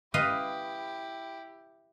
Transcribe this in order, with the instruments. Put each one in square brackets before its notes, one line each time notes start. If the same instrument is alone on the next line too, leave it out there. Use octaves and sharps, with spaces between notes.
[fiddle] E4 G4 [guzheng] B4 D#5 F5